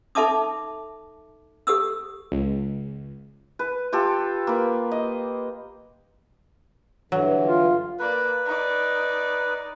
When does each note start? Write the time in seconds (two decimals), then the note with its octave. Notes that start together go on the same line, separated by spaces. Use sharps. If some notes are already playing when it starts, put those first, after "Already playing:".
0.15 D#4 A4 E5 A5 D6 D#6
1.67 G4 A4 D#6 E6
2.32 C#2
3.59 B4
3.92 F4 G4 A4
4.47 A#3 B4
4.92 D#5
7.12 G2 D3 E3 F#3
7.45 F4
7.99 A#3 B4 D5
8.46 D#4 D5